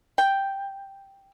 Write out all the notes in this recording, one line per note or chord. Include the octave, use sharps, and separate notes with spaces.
G5